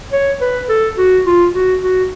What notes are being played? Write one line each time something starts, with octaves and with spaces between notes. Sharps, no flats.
C#5
B4
A4
F#4
F4
F#4
F#4